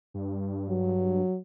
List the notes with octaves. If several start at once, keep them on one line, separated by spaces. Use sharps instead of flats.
G2
F#3